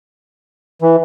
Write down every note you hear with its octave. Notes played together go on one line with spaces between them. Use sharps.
E3